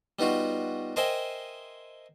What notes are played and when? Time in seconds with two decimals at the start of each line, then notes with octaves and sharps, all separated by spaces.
0.19 G3 B3 D#4 F4 F#4
0.96 A#4 C5 D#5 E5 G5 G#5